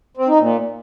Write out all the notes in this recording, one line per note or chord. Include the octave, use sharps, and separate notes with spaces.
C4
D#4
A#2